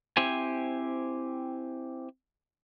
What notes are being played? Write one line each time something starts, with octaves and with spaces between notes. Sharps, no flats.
C4 E4 G4 C5 G#5